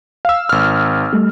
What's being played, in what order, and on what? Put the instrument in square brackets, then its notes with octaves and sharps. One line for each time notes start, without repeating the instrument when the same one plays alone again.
[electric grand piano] F5 E6
G#1 F6
[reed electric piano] G3 A3